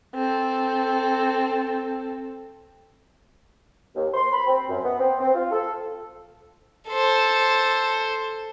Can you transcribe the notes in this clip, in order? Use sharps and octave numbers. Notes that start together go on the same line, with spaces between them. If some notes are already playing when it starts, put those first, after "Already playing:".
C4 A4
D#2
C6
B5
C4
F#2
B3
C4
C4
F4
A4
A4 C5